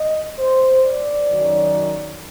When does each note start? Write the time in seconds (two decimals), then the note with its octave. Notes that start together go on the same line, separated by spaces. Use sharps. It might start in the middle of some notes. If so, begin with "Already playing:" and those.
Already playing: D#5
0.39 C5
0.85 D5
1.30 F#2 D#3 F#3